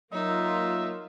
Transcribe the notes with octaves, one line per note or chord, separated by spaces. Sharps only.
F#3 A#3 D#4 F4 E5